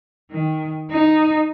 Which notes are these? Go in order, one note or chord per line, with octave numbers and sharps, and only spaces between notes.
D#3
D#4